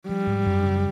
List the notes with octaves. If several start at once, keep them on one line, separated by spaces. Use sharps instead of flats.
F3 G3
G#2
F#2
C#3